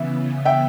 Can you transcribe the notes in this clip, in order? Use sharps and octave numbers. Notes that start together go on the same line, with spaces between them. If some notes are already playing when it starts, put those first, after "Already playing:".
Already playing: C#3 E3 B3 E5
E5 G5